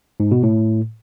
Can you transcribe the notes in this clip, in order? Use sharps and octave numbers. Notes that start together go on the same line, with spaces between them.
G#2
B2
A2